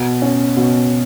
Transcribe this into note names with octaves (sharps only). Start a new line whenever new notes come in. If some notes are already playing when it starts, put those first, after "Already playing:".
Already playing: B2
C#4
B2